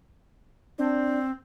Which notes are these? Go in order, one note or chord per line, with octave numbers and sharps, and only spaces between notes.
C4 D4